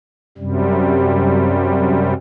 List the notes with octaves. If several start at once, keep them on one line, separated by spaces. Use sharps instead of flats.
F#2 C3 G3